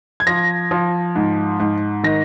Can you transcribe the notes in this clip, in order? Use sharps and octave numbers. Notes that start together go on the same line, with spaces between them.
G#6
F3 A#6
F3
G#2
G#2
D#3 A#6